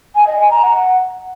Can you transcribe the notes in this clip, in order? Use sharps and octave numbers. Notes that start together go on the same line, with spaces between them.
G#5
D#5
G#5
A#5
F#5